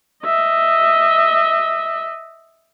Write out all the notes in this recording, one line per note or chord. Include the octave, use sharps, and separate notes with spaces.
D#5 E5